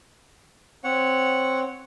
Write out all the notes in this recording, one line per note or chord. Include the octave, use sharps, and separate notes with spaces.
C4 C#5 F#5